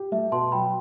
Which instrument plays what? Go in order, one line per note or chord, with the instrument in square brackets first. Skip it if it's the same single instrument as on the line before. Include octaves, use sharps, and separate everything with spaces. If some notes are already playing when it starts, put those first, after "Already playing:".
Already playing: [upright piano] G4
[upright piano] A3 [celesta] E5
[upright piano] B2 [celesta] A5 C6
[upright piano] F#3 [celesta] G5 B5